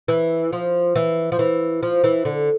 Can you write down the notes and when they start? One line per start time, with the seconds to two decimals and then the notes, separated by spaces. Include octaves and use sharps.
0.08 E3
0.53 F3
0.96 E3
1.32 F3
1.39 E3
1.83 F3
2.04 E3
2.25 D3